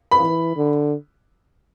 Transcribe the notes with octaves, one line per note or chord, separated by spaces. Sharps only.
B5
E3
D3